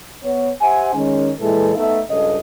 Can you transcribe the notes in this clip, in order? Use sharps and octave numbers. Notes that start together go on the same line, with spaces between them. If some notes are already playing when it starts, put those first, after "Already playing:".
B3 C#5
G4 C5 E5 F#5 G#5
D#3 G#3 C#4
A#2 E3 G#3 A4
A3 B3 D#4 E5
C#2 G2 C#3 A4 D#5